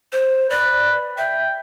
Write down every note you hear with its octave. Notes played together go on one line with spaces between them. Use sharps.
C5
B4 D5
E5 G5